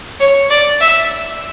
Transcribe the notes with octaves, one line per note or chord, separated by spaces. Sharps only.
C#5
D5
E5